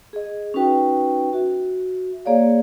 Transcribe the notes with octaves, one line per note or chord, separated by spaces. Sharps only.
G#4 D#5
C#4 D#4 F#4 B4 G5
F#4 E5
A#3 G#4 C#5 D5 F5